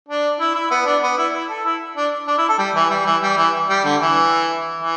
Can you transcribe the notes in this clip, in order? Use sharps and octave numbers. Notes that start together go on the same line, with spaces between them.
D4
E4
E4
B3
D4
B3
E4
E4
A4
E4
D4
D4
E4
A4
G3
E3
G3
E3
G3
E3
G3
D3
E3
E3